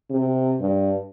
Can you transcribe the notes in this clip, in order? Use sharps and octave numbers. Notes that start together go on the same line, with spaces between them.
C3
G2